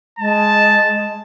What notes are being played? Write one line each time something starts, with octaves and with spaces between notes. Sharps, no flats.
G#3 A5